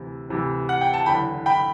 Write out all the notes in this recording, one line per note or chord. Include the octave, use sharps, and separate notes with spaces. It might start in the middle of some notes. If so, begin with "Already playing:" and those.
Already playing: D2 C3 E3
D2 C3 E3
F#5
G5
A5
F#1 E2 D3 G5 B5
G5 B5